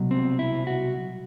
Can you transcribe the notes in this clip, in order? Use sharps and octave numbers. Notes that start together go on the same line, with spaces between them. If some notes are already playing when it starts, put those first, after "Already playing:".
Already playing: C2 B2 F#3
C4
E4
F#4